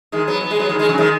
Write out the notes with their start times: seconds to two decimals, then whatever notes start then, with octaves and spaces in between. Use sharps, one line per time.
0.12 D#3 G#3
0.28 F#3 B3
0.41 B3
0.51 G#3
0.59 F#3 B3
0.69 D#3 G#3
0.79 D#3 G#3
0.89 C#3 F#3
0.98 D#3 G#3